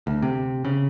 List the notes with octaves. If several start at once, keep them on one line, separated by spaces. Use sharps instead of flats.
D2
C3
C#3